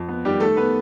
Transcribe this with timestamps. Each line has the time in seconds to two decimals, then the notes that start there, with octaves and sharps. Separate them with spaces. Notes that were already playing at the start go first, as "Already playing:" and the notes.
Already playing: F2
0.08 B3
0.25 D#3 G3 G4
0.40 D#3 A3 A4
0.57 B3 B4